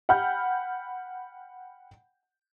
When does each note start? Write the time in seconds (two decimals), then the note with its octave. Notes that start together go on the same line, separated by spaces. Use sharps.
0.09 F#5 G5 B5 F6 G6